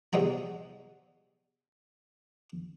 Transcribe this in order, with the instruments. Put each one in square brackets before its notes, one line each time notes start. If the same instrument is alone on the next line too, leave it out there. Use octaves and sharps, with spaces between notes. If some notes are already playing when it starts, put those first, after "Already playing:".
[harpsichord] E2 C3 G#3 F#5 A#5